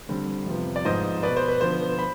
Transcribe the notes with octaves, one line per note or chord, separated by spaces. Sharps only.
D3 G3 C4
F2 C3 F3 B3
D5
G#2 F3 B3 C5 D#5
B2 B3 B4 D5
C5
B4
D3 F3 B3 C5
B5